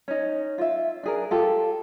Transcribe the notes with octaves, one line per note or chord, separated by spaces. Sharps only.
C#4 D#4
F4 E5
D4 G#4 A#4
F4 G4 A4